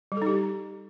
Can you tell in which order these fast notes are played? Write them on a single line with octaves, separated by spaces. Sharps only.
G3 A4 D#4 G4